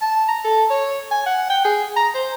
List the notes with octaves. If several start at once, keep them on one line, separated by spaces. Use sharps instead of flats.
A5
A#5
A4
C#5
G#5
F#5
G5
G#4
A#5
C5